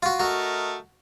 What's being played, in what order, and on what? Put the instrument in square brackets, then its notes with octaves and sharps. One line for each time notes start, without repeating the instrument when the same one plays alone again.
[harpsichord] F4 F#4
[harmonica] A3 A#4 D#5 [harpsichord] F#4